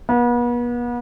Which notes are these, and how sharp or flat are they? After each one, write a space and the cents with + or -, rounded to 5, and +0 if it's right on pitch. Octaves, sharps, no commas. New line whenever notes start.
B3 -40